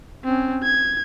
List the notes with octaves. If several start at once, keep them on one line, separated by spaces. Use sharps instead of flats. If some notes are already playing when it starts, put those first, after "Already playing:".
C4 C#4
G#6